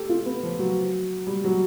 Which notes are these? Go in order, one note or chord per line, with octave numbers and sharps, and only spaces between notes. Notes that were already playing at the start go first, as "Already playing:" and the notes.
Already playing: G4 A4
F4
B3
F3
F#3
G3
F#3